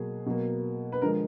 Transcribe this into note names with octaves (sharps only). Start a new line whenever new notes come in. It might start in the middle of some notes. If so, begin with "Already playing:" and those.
Already playing: B2 F#3 A#3 G#4
B2 F#3 A#3
B4
D3 F3 G#3 A#4